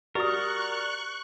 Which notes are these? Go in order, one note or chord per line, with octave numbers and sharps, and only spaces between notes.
F#4 G4 A#4 D5 C#6 D#6 F#6 A6